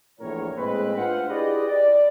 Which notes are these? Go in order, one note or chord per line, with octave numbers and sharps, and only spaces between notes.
A#1 E2 A2 A#4 C#5
A2 G#3 A#3 C4 B4
D4 F4 B4 C5 F5 F#5
E4 G4 G#4 B4 D5 D#5
D5